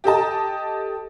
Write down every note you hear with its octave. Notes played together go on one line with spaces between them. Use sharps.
G4 A4 D#5 A5